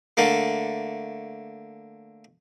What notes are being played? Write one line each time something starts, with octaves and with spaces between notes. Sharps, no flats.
D3 A3 A#3